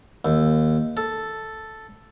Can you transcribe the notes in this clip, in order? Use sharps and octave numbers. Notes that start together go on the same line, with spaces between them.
D#2
A4